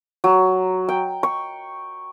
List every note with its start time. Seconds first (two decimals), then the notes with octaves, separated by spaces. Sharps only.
0.24 F#3
0.89 G5
1.23 C#6